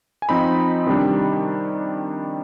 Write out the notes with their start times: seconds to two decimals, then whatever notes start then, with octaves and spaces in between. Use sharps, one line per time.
0.22 G#5
0.29 F3 C4 D#4 B5
0.86 C3 D#3 G3 D4